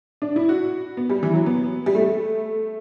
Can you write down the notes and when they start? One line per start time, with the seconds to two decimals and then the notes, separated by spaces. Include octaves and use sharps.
0.22 D4
0.36 E4
0.49 F#4
0.97 B3
1.10 G3
1.23 E3
1.34 F#3
1.46 B3
1.86 G3
1.95 A3